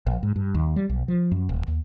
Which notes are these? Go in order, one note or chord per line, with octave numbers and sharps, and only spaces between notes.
A#1
G#2
G2
D#2
G3
B1
F3
F#2
D#1
D#2